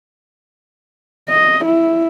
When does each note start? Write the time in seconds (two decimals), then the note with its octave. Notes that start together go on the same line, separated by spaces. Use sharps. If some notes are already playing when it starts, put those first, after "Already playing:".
1.29 D#5
1.65 E4